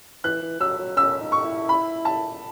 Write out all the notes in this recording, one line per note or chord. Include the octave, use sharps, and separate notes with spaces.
E3 F#6
E3
F#3 E6
F#3
C#4 E6
D#4
C#6
E4
B5
A5